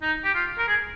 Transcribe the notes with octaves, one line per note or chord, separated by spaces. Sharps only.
D#4
G4
F4
A#4
G#4